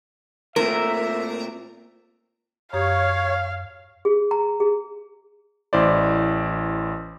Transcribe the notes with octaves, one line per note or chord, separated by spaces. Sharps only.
A#2 A3 C4 A#4 E5
F#2 G4 C#5 F5 D#6
G#4
A#5
G#4
A1 E4 C5 D5